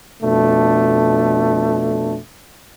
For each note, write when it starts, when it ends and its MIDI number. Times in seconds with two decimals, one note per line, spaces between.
0.23 2.18 41
0.23 2.18 47
0.23 2.18 57
0.23 2.18 62